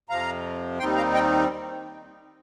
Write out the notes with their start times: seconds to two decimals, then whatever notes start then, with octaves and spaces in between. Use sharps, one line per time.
0.09 F2 C3 F3 F5 A#5
0.79 D#2 D#3 G3 C4 D#4 G5 C6
0.96 F5 A#5
1.14 D#5 G5